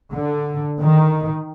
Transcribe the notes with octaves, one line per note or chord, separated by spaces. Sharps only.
D3
D#3